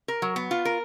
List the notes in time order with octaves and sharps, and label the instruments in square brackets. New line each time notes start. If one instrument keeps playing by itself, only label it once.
[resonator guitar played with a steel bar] A#4
F#3
B3
F4
A#4